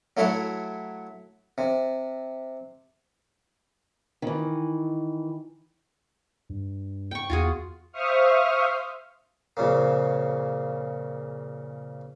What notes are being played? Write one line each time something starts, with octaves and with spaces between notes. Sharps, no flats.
F#3 A3 E4 F#4 C#5
C3
D#3 E3
G2
G5 C#6
E2 F4 F#4 G#4
C5 E5 F5 C#6 D#6 F6
F2 A#2 C#3 A#3